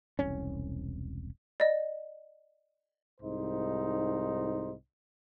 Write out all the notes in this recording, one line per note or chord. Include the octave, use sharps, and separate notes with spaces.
E1 C2 C#4
D5 D#5
C2 G#2 D#4 C5